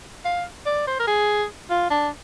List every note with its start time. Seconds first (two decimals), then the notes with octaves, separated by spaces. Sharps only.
0.25 F5
0.66 D5
0.87 C5
0.99 A#4
1.07 G#4
1.70 F4
1.90 D4